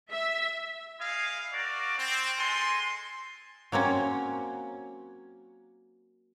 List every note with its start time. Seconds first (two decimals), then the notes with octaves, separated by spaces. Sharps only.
0.11 E5
1.00 E4 G#4 D#5 F5
1.52 F#4 A#4 D5
1.98 C4
2.38 G#3 A4 G#5 C6
3.72 F#3 A#3 C4 C#4